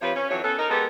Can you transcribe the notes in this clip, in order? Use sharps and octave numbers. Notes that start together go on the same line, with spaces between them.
C3 F3 B4 C#5
C#4
F2 E3 F#3 C#5
B3 C#4 A4
D#4 A#4
G#3 B3 G4 A4 A#4